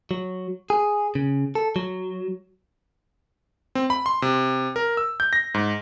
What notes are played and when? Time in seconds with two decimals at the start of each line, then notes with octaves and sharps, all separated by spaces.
0.11 F#3
0.70 G#4
1.15 C#3
1.55 A4
1.76 F#3
3.75 C4
3.90 B5
4.06 C6
4.22 C3
4.76 A#4
4.97 E6
5.20 G6
5.33 A#6
5.54 G#2